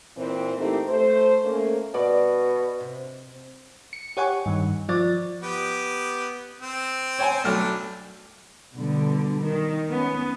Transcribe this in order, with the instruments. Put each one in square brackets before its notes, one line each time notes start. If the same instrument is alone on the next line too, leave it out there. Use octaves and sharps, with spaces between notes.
[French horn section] A#2 E3 C4
A3 A#3 C4 D#4 E4 G4
A3 C5
A3 A#3 C#4
[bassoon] B2 [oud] D5
[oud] C3
[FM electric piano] C#7
G4 C#5 F#5 G#5 C#6
G2 D#3
F3 D5 A6
[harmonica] B3 G4
C4
[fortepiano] C#5 G5 G#5
[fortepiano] B1 A3 F6 [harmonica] D4
[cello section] B2 D3 G3
D#3
B3 C#4